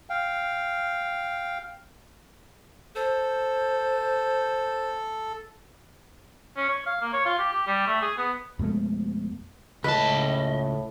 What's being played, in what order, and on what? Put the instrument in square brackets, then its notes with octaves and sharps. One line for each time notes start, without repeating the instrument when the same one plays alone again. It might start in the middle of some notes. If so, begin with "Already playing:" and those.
[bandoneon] F5 G5
[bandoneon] A4 [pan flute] C5
[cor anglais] C#4
C#5
F5
A#3
C#5
F4
G4
G4
G3
A3
G#4
B3
[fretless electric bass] F2 B2 G#3 A3
[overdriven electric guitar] C#2 A5 [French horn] A2 [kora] B4 [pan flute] D#5